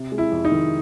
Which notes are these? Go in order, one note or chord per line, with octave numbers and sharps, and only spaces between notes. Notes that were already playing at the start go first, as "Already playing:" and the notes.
Already playing: C3
G#3
E4
F2
D#4
D#3